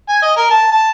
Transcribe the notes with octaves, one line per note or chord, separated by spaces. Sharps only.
G#5
D#5
A#4
A5
A5